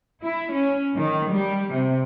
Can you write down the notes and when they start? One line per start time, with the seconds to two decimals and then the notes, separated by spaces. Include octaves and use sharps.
0.23 E4
0.53 C#4
0.94 D#3
1.31 G3
1.72 C3